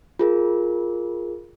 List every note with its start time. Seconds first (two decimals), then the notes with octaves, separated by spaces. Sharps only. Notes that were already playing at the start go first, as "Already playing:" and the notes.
0.19 F4 G#4 A#4